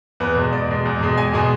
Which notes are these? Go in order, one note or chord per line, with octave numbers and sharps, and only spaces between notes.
E2 B4
B2 G#3
E2 D5
B2 G#3
E2
B2 G#3
E2 G#5
B2 G#3